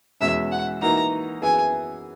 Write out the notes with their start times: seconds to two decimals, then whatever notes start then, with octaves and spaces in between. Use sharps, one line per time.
0.21 E2 B2 G#3 C#4 E5
0.52 F#5
0.81 E3 A#3 D#4 F#4 A#5
1.42 F#2 E3 B3 E4 G#4 G#5